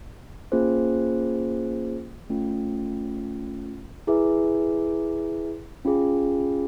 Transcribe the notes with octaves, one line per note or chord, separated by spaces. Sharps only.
A#3 C#4 F4 G#4 C5
A3 C#4 F4
E4 G#4 B4 E5
C#4 F4 G#4